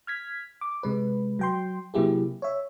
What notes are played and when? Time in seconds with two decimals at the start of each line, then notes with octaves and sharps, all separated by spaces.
0.07 F6 G#6 B6
0.61 D6
0.83 C3 G#3 B4
1.39 F#3 G5 C6
1.94 C3 F#3 A#3 E4 G4 G#4
2.42 C#5 E5